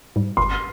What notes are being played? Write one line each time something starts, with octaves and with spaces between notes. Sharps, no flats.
G#2 G3
G1 C6